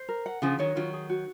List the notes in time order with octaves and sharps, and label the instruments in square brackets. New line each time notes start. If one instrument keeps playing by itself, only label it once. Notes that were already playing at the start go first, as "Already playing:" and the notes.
Already playing: [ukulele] C5
A#4
F#5
[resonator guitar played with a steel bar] C#3 F3 [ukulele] G#4
[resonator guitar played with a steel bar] D#3 F#3 [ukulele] C#5
[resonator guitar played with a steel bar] D#3 F#3 [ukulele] F4
[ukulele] G#4
F#4